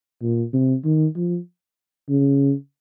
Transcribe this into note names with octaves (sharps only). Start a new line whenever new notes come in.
A#2
C3
D#3
F3
C#3